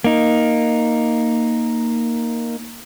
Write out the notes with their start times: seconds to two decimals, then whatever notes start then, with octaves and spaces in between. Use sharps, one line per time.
0.04 A#3 D#4